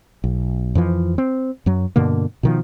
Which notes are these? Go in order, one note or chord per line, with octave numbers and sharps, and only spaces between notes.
B1
F2 E3 F3
C4
F#2 F#3
G2 B2 D3 A#3
B2 D#3 F3